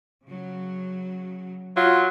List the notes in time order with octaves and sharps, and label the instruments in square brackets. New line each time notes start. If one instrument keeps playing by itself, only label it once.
[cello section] C#3 F#3
[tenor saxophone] F#3 [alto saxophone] F4